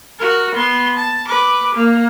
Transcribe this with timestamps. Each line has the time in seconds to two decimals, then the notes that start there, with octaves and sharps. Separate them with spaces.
0.19 F#4 A#4
0.55 B3 C6
0.97 A5
1.28 B4 D6
1.75 A#3